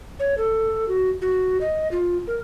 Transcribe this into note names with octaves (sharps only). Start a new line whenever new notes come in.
C#5
A4
F#4
F#4
D#5
F4
A#4